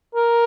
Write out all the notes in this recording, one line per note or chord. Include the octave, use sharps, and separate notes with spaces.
A#4